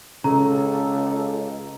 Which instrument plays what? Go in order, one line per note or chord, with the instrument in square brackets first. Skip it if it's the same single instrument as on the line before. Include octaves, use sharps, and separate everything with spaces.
[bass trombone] C#2 [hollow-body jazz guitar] C#3 [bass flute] A4 [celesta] A#5